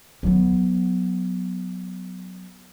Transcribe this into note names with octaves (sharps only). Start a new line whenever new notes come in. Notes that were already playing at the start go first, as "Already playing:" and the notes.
F#3 B3